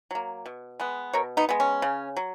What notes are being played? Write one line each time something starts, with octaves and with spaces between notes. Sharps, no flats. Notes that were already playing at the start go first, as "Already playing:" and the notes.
F#3 A#3
B2
G#3 B3
B2 A#4 C#5
B3 D#4
G#3 B3
C#4
C#3
F#3